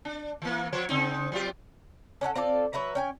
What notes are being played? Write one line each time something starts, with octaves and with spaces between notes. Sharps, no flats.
D4
E3 A#3
F3 C5 C#5
C#3 C4 D#4
F#3 F4 G4
C#4 D4 A4 F#5
C4 F4 A4 D5
F#3 B4 E5 A#5
C#4 G5 G#5